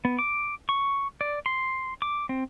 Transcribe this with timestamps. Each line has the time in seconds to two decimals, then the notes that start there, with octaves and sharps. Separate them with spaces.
0.05 B3
0.19 D6
0.69 C#6
1.21 D5
1.46 C6
2.02 D6
2.29 C4